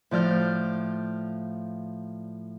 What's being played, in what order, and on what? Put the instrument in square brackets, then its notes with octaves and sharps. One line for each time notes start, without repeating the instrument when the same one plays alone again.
[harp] A2 F3 D5 F6 G6